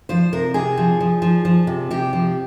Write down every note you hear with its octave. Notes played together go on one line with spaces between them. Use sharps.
F3 C5
C3 A#4
C3 G#4
F3
F3
F3
F3
C3
C3 G4
F3